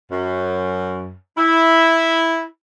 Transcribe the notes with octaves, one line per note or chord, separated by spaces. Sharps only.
F#2
E4